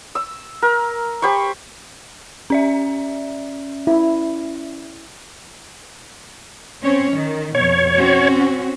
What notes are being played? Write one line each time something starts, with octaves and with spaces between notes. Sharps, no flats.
E6
A#4
G4 C5 B5 C#6
C#4 D5 E5
E4
C4 C#4 C#5
D#3
F2 B2 C#5
C4 C#4 F#4